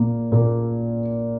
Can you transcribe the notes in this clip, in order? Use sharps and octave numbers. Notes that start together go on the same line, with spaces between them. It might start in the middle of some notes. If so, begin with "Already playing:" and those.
Already playing: A#2 A#3
A#2 A#3